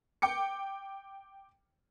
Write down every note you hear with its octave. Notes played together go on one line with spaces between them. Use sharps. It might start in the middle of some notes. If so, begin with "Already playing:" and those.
G5 D6 C#7